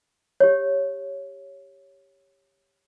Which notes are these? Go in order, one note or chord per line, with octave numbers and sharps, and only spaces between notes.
G4 C#5